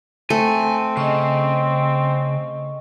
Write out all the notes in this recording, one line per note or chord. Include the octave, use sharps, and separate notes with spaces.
A3 C4 G#5
C#3 D#5 C#6